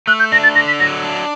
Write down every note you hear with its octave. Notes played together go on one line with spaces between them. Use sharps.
A3 F#6
G6
D4 A#6
A6
D3 A#6
B6
F#3 A#6
D4